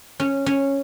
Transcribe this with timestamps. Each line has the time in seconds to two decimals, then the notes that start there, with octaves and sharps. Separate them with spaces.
0.20 C#4
0.46 C#4